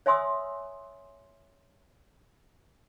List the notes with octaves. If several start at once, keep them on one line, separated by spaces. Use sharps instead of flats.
C#5 E5 G#5 C6 D#6 E6